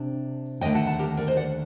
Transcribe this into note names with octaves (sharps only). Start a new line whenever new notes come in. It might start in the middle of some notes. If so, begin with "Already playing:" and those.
Already playing: C3 D4
D#2 D3 A3 D#5 G5
F#5 A5
F#5 A5
G4 A#4
A#4 D5
C5 D#5
D5 F#5